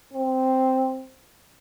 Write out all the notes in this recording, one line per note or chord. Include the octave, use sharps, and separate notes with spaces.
C4